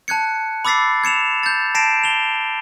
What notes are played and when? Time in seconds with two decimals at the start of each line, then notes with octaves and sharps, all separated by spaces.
0.08 A5 F#6 G#6 C#7
0.65 B5 D6 E6 A6 B6 C7
1.04 G#6 C#7 E7 F7
1.43 G6 A6
1.75 A5 A#6 C7 D7 E7
2.04 F7 G7